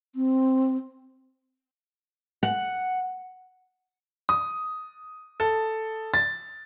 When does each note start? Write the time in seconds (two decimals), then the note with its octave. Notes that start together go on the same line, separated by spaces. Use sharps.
0.15 C4
2.43 F#5
4.29 D#6
5.40 A4
6.14 A6